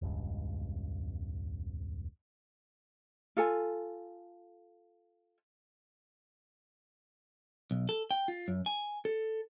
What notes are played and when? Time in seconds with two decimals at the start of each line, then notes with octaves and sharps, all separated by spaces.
0.02 E1 C#2 G2 G#3
3.37 F4 A4 G#5
7.71 B1
7.89 A4
8.11 G5
8.28 F4
8.48 F#2
8.66 G#5
9.05 A4